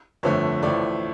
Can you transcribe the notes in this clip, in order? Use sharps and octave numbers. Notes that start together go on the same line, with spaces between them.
G1 F2 D3 F3 A3 C#5
A1 A2 F3 A3 D5